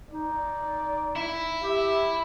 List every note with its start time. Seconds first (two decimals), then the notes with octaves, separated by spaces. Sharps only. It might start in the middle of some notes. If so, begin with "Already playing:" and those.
0.11 D#4 D5
1.16 E4
1.63 G4 E5